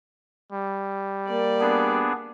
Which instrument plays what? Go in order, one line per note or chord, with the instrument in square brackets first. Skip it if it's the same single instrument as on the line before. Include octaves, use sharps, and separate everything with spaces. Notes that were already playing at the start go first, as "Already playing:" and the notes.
[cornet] G3
[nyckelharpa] A#3 D5
[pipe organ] B3 D4 G#4